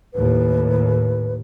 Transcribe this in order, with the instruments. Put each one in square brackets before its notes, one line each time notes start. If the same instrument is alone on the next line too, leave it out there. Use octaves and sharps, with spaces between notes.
[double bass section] D#2 A2 [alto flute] B4